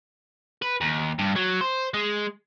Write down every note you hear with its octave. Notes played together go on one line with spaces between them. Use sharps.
B4
D#2
G2
F#3
C5
G#3